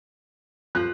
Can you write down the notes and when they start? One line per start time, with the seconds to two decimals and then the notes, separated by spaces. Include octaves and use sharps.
0.75 F3 F#6